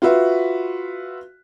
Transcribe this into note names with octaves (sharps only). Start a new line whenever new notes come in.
F4 F#4 B4 E5